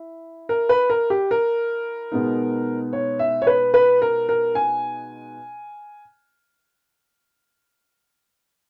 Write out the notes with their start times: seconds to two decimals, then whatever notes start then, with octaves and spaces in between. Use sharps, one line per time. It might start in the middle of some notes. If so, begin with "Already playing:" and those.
Already playing: E4
0.49 A#4
0.69 B4
0.90 A#4
1.10 G4
1.31 A#4
2.12 B2 G#3 B3 D#4
2.93 C#5
3.19 E5
3.42 C#5
3.47 B4
3.74 B4
4.02 A#4
4.29 A#4
4.55 G#5